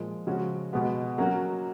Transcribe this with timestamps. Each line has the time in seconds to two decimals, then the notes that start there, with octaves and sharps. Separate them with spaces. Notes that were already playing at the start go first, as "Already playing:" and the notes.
Already playing: A#2 F3 G#3
0.27 C#3 F3 G#3 C#4 F#4
0.73 B2 G#3 B3
1.18 F#3 A#3 C#4 F#4